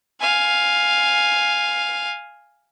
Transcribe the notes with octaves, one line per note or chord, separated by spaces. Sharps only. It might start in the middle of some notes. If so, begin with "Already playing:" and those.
F5 G#5